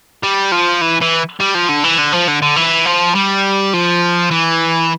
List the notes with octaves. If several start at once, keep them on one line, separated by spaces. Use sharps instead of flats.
G3
F3
E3
E3
G3
F3
D3
E3
D3
F3
D3
D3
E3
F3
G3
F3
E3